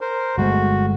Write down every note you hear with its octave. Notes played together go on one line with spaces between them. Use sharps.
A#4 C5
G1 G#3 A3 F#4